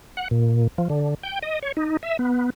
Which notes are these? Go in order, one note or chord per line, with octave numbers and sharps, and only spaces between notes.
F#5
A#2
F3
D3
G5
D#5
C#5
D#4
E5
B3